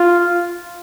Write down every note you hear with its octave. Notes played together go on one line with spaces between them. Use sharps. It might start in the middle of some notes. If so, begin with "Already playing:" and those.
Already playing: F4